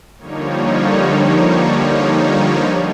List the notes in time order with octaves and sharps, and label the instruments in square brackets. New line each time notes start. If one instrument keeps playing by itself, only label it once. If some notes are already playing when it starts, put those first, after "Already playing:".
[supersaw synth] D3 F3 G3 A#3 D#4 C#5